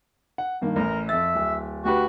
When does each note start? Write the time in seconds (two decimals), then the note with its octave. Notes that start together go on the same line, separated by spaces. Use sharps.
0.38 F#5
0.61 G2 D#3 A#3
0.76 A1 A2 A#4
1.09 F2 E5 A6
1.35 D1
1.85 D2 F#4 G4 B4